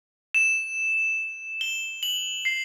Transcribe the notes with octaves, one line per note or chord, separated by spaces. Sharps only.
E7
G7
F#7
C7